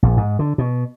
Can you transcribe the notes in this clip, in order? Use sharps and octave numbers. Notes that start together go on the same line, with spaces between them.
A#1
G#2
D3
B2